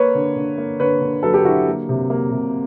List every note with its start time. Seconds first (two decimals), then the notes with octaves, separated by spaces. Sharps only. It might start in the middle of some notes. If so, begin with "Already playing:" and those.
Already playing: A#3 B4 C#5
0.15 D3
0.36 D3
0.58 A#3
0.80 D3 B4 C#5
1.02 D3
1.23 F#3 A4 B4
1.34 G4 A4
1.45 D3 E4 F#4
1.67 A#3
1.89 C3
2.10 A#3
2.31 C3